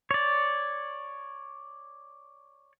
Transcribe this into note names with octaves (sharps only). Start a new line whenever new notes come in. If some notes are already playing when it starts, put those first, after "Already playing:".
C#5 D5